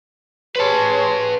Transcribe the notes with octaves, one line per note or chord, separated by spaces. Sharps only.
G#4 B4 C#5 A5 C6